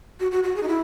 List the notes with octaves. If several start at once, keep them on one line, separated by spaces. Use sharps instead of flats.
F#4
F#4
F#4
G#4
D#4
E4